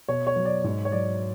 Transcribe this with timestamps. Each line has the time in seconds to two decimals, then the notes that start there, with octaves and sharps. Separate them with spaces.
0.08 B2 C#5
0.27 C#5
0.36 F#3
0.45 D5
0.64 G#2 C#5
0.85 C#5
0.92 F#3 D5